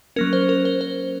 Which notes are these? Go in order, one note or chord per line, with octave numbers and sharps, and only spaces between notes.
F#3 A#3 C#4 A#4
C5
A#4
C5
C5